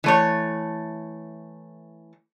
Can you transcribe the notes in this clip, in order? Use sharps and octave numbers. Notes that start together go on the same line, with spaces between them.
E3 A3 C#5